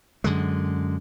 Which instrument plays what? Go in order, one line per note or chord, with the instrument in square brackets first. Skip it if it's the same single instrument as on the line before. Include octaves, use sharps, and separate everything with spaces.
[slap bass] F#2 D3 G#3